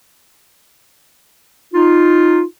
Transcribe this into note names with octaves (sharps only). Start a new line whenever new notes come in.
D#4 F4